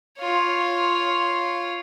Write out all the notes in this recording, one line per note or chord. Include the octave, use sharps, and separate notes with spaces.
F4 C#5